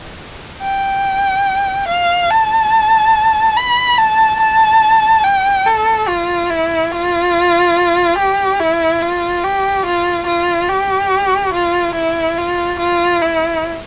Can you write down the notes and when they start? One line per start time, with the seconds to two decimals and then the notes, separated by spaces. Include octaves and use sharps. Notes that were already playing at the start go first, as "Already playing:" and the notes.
0.62 G5
1.88 F5
2.30 A5
3.57 B5
3.98 A5
4.40 A5
5.24 G5
5.67 A4
6.08 F4
6.50 E4
6.92 F4
8.18 G4
8.60 E4
9.02 F4
9.44 G4
9.86 F4
10.27 F4
10.70 G4
11.54 F4
11.95 E4
12.38 F4
12.79 F4
13.22 E4